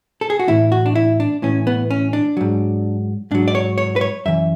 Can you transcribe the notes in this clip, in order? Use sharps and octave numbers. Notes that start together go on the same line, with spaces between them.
A4
G#4
F#4
A2 E3 E4
F#4
D4
E4
D4
A2 E3 C#4
B3
C#4
D4
G#2 F#3
G#2 F#3 D4
D5
C#5
C#5
B4
C#5
F#2 E3 E5